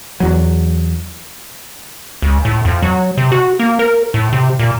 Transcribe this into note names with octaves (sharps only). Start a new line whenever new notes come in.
E2 F#3
C#2
A2
F2
F#3
C3
F#4
A#3
A#4
A2
C3
A#2